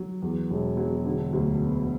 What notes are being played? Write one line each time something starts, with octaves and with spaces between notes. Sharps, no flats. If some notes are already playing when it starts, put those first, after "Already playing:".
Already playing: F#3
E2
E1
F#3
D3
D2
B3